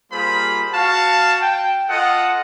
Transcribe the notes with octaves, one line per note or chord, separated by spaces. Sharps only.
G3 A#3 F4 G#4 C5 B5
F#4 F5 A5
G5
F4 A4 D#5 F#5